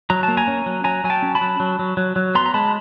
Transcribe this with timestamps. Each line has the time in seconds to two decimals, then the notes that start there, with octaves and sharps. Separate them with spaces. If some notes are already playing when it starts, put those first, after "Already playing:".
0.10 F#3 A#5
0.23 A5
0.28 A#3
0.37 G#5 A#5
0.48 C#4
0.66 F#3
0.84 F#3 G#5 A#5
1.04 F#3 G#5
1.10 G5 A5
1.22 C#4
1.35 A5 B5
1.41 F#3
1.60 F#3
1.79 F#3
1.97 F#3
2.16 F#3
2.35 B3 A#5 C6
2.46 A#5
2.54 G#3 A5 B5